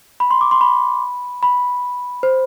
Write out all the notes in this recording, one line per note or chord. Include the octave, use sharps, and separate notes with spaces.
B5
C6
D6
C6
B5
B5
C5